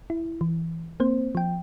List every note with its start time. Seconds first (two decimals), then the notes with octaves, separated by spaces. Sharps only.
0.10 E4
0.41 E3
1.00 A#3 C4 C5
1.35 F3 G5